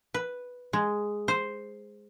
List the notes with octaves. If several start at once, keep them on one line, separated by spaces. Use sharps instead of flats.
B4
G#3
C5